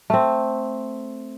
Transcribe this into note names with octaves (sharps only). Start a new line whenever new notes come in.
A3 C4